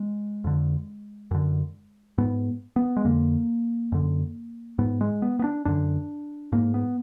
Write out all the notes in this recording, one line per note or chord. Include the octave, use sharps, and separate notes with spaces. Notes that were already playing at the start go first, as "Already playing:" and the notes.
Already playing: G#3
F2 D3
F#2 D3
G#2 B3
B3
G#3
F2 D3 A#3
F#2 D3
G#2 B3
G#3
B3
B3
D4
F#2 D3 D4
G#2 A#3
B3